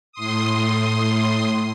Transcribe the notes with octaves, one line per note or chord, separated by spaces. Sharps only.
A2 C6 D#6